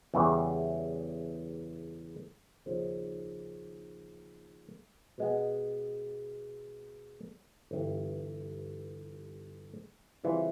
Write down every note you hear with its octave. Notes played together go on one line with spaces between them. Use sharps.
E2 C#3 E3 G3
D#2 C#3 F3
B2 G#3 B3
G1 G2 E3
C#3 E3 G3 C4 F4